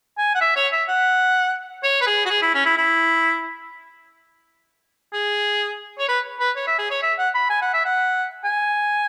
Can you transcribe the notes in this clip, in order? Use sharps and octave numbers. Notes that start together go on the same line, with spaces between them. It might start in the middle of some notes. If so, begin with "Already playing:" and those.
G#5
F#5
E5
C#5
E5
F#5
C#5
B4
G#4
F#4
G#4
E4
C#4
E4
E4
G#4
C#5
B4
B4
C#5
E5
G#4
C#5
E5
F#5
B5
G#5
F#5
E5
F#5
G#5